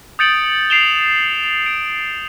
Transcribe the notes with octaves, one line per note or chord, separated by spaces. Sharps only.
D#6 G6 A6 C#7 D7 F#7
C7 D7 E7 F7 G7
D7